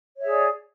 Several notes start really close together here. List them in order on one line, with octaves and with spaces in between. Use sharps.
C#5 E5 G#4 D5